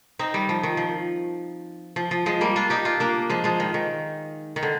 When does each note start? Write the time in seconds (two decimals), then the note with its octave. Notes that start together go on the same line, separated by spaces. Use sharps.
0.19 C4 D#4
0.34 D#3 G3
0.49 F3
0.63 D#3
0.77 F3
1.96 F3
2.11 F3
2.26 F3 G#3
2.41 G3 A#3
2.56 D4 F4
2.70 D#4 G4
2.85 D4 F4
3.00 A#3 D4
3.29 F3 G#3
3.44 F3 G#3
3.60 D#3
3.74 D#3
4.56 D#3
4.63 D3